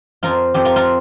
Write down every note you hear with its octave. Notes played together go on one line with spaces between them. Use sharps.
F2 F3 F4 A#4
F2 F3 G4 C5
F4 A#4
F4 A#4